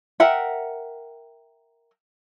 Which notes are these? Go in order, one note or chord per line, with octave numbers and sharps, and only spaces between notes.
A#4 E5 F#5 G5